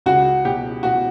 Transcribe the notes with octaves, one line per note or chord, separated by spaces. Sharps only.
C#2 F#4
B2 G4
B2 F#4